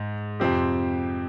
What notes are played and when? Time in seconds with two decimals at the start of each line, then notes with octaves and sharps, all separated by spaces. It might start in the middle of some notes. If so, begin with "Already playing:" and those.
Already playing: G#2
0.40 F2 C3 F3 C4 G4